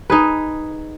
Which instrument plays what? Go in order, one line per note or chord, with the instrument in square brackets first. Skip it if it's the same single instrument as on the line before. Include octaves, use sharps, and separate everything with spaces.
[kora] D#4 G#4 B4